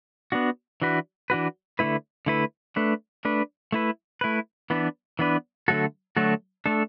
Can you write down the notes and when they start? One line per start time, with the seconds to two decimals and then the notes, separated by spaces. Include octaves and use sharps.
0.32 B3 D4 F#4
0.82 E3 D4 F#4 B4
1.30 E3 D4 F#4 B4
1.79 D3 A3 E4 B4
2.26 D3 A3 E4 B4
2.76 A3 D4 B4
3.25 A3 D4 B4
3.72 A3 E4 B4
4.21 A3 E4 B4
4.70 E3 B3 D4 B4
5.19 E3 B3 D4 B4
5.68 D3 F#3 A3 F#4 A4
6.17 D3 F#3 A3 F#4 A4
6.66 A3 D4 A4